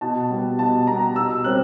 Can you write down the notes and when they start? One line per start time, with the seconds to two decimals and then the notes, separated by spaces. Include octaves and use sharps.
0.01 B2 A5
0.30 G3 B3
0.59 B2 A5
0.87 G3 B3 A#5
1.16 B2 E6
1.44 G3 C4 F#6